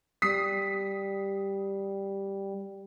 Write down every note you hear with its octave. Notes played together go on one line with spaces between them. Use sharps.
G3 D#6 B6 C7